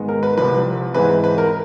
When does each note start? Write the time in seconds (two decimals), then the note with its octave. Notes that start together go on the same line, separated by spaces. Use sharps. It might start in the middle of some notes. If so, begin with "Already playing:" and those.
Already playing: G#2 D#3 G#3 B3
0.09 A#4
0.23 B4
0.37 C2 C3 F3 B4
0.94 G#2 E3 G#3 C4 B4
1.24 B4
1.38 A#4